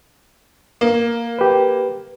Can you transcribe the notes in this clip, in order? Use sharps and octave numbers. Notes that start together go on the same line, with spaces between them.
A#3
G4 B4